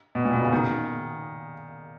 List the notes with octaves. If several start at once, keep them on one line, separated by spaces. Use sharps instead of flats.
B2
A#2
B2
C#3
D#3